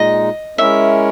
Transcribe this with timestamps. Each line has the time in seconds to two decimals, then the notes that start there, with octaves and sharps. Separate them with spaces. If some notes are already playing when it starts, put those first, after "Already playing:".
Already playing: A#2 G#3 D#4 D#5
0.58 G#3 C#4 E4 A#4 C#5 E5